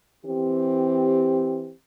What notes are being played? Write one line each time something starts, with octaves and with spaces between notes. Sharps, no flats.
E3 C4 G4